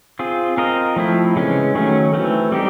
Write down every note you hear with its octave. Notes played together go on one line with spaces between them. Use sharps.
C4 F4 G#4
C4 F4 A#4 D#5
F3 A3 C4 E4
C#3 E3 G#3 C#4
D#3 F#3 A3 C#4
E3 A3 C4
G3 C4 D#4 G4